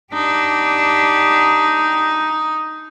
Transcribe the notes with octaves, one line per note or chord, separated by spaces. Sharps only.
D4 D#4 G4